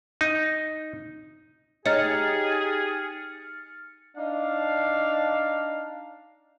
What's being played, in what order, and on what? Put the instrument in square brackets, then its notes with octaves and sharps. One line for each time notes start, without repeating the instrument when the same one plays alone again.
[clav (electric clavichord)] D#4
[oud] D#4 [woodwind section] G4 G#4 [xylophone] C#5 [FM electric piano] F6 A6 C#7
[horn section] D4 D#4 F5